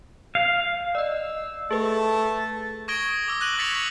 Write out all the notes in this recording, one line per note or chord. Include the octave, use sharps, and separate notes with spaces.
F5
D5 D#5 E6
A3 G#4 B4 A5
C#6 D#6 G#6 A#6 D7 G7
D#6 A#6
D6 E6
D6 F#6 A#6 D#7 F#7
C#6 A6 B6 C#7 F7
G#6 B6 F7 F#7